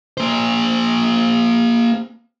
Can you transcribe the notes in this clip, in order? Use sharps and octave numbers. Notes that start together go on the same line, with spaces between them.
A#3 C5